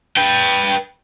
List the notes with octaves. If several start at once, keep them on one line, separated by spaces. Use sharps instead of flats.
B4 G5